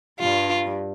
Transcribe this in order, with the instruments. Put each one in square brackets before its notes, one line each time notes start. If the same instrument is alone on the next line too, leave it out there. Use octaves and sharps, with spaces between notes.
[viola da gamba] G2 G3 [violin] F4